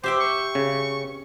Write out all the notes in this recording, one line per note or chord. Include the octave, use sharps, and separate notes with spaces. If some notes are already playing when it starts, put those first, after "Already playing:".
G4 C5 E5 G5
C#6
C#3